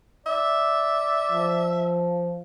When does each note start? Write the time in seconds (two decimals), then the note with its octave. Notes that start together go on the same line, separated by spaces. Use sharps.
0.26 D5 E5
1.31 F3